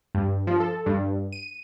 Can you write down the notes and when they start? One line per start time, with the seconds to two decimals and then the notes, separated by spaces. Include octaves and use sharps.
0.15 G2
0.47 F3
0.60 A4
0.86 G2
1.32 D#7